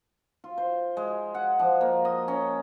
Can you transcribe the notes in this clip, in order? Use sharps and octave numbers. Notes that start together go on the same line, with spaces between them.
F4
C5
G#3
F#5
F3
A#3
D#5
C#4